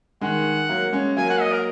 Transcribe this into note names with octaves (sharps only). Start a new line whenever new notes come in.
D#3 G#3 F#5
F#3 A#3
G#3 C#4
F#3 A#3 G#5
F#5
D#5
A#4